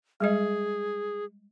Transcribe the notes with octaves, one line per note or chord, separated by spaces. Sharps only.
G3 G#3 G#4 D#5